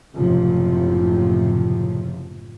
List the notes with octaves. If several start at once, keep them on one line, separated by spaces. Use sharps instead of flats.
F#1 A2 C3 F3